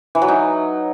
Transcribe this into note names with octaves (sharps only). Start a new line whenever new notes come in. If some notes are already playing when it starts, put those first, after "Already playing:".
E3
F#3
D#4